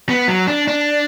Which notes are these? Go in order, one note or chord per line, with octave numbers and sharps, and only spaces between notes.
B3
F#3
D4
D4